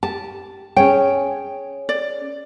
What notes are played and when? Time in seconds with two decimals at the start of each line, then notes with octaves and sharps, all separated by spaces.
0.03 G4 A5
0.76 C#4 G#4 C#5 G5
1.89 D5